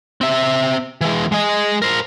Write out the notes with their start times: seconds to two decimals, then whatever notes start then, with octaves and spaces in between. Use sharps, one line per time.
0.21 C4 E5
1.01 E3 G#3
1.32 G#3 D#5
1.82 A#4 C5